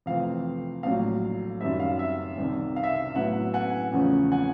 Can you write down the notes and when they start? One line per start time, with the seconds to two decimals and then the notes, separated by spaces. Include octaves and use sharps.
0.06 F2 C3 E3 A3 C4 F5
0.83 A#1 A2 F#3 F5
1.61 F#2 D#3 G3 E5
1.80 F5
1.99 E5
2.38 C2 C3 D#3
2.76 F5
2.83 E5
2.91 F5
3.15 A2 F#3 B3 E4 E5 F#5
3.54 F#5 G#5
3.92 E2 C#3 F3 A3 C#4
4.32 F#5 G#5